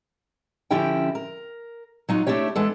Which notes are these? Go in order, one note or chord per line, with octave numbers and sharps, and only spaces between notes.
D3 F3 C#4 E4 G4 G5
A#4
F#3 D#4 F4 F#4
A3 D4 E4 G4 C#5
E3 G#3 B3 D4 A4